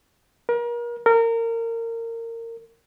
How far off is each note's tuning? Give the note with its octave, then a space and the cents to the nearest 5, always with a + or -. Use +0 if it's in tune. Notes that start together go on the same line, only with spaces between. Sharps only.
A#4 +35
A#4 -25